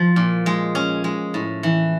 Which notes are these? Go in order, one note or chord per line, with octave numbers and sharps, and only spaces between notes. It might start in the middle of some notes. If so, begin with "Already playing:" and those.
Already playing: F3
A#2
G#3
C#4
G#3
A2
E3